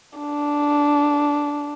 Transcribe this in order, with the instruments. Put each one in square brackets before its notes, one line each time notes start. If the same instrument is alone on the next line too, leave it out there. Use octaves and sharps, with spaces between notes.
[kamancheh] D4